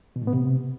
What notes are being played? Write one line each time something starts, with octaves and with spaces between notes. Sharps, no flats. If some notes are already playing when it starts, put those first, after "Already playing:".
B2
A2
B3
C3